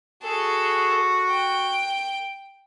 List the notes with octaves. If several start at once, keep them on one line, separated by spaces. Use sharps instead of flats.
F#4 G#4 A4
G5